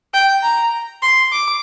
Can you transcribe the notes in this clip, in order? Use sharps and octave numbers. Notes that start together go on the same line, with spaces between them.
G5
A#5
C6
D6